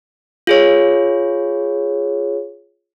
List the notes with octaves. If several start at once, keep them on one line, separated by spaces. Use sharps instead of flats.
F4 G#4 C#5